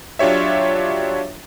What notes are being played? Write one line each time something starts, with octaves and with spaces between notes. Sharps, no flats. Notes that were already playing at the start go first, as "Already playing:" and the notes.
F#3 D4 F4 G4 C#5 E5